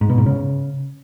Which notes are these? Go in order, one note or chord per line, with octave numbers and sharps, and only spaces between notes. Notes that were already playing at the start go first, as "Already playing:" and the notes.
G#2
B2
G#2
C#3